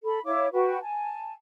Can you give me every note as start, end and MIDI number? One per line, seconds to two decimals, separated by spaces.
0.04 0.19 69
0.04 0.19 83
0.24 0.47 64
0.24 0.47 73
0.24 0.47 77
0.24 0.47 86
0.53 0.78 66
0.53 0.78 71
0.53 0.78 79
0.53 0.78 85
0.81 1.32 80
0.81 1.32 81